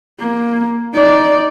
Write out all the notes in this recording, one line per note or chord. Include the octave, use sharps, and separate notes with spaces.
A#3
D#4 D5